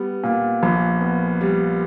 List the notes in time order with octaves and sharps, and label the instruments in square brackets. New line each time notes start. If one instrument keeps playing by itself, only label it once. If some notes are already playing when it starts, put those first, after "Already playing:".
Already playing: [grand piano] G3 B3
A#2
A#1
B3
G3